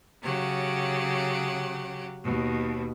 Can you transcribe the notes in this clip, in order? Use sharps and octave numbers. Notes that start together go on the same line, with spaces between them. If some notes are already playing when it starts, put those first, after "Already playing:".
C#3 F#3 G4 F#5
D#2 B2